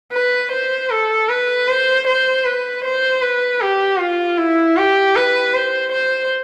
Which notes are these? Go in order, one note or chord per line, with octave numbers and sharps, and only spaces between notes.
B4
C5
A4
B4
C5
C5
B4
C5
B4
G4
F4
E4
G4
B4
C5
C5